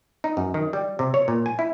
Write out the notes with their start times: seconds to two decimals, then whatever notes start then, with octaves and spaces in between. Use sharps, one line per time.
0.24 D#4
0.37 F#2
0.54 D#3
0.73 G3
0.99 C3
1.14 C#5
1.28 A#2
1.46 G#5
1.59 E4